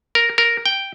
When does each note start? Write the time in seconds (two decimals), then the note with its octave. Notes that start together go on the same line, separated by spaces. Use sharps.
0.15 A#4
0.38 A#4
0.66 G5